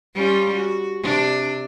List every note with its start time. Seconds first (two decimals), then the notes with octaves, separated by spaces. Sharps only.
0.15 G3 C#4 F4
0.55 F#4
1.03 C3 D4